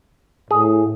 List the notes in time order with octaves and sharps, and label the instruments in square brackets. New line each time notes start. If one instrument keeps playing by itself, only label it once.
[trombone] A2 [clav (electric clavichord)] G#4